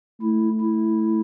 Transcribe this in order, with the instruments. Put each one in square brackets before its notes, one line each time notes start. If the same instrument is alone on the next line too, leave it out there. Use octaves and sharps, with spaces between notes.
[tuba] A3 [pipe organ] E4
[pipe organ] E4